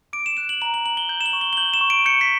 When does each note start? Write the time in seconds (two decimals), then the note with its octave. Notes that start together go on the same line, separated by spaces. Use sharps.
0.13 D6 D7
0.26 E7
0.37 F#6 E7
0.49 F#7
0.62 A#5 F#7
0.74 F#7
0.86 A#5 F#7
0.97 G7
1.09 G6 F#7
1.21 E7
1.26 F#7
1.33 C#6
1.41 G7
1.53 G7
1.57 G6 F#7
1.74 E7
1.81 C#6
1.90 D7
2.06 G6 C#7
2.21 B6